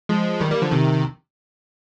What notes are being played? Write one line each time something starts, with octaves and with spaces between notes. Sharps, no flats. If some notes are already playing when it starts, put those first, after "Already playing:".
F3 G#3
D#3 G3
G3 A#3
D3 F3
C3 D#3